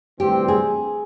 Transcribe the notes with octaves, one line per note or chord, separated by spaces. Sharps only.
D2 C3 E3 G3 C4 G4
G#4